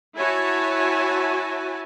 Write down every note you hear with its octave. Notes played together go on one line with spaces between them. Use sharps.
E4 F#4 C#5 E5 G#5 A5